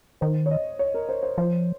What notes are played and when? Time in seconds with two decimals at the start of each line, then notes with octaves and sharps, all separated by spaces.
0.21 D#3 C5
0.46 C#5
0.51 D#5
0.79 C#5
0.94 A#4
1.09 C5
1.23 C5
1.38 F3 C5